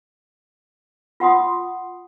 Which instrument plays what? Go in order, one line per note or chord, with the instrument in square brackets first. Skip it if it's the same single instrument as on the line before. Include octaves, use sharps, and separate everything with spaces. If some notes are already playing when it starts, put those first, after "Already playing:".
[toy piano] F4 F#5 C6 D#6